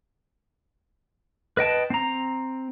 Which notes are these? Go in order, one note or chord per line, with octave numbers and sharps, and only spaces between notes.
B4 D#5 G5 A5
C4 A#5